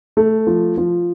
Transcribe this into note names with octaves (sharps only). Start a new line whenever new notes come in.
A3
F3
F3